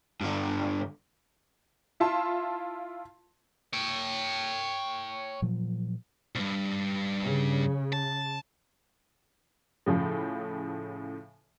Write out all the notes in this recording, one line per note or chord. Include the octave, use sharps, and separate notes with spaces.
G2 D3
E4 F4 A5 C6
C#5 G5
A#2 F3 F#3
C2 G2
C#3
A5
A2 C#3 F3